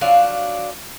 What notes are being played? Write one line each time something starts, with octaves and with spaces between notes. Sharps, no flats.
F3 F#3 D4 F5